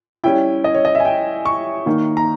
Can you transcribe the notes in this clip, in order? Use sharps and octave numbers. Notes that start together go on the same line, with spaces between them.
G3 C#4 E4 G5
D#5
C#5
D#5
E5
G#5
G5
C#6
D#3 A#3 D#4
A#5